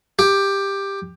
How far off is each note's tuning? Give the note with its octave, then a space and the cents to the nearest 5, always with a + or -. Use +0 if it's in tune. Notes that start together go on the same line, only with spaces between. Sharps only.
G4 +10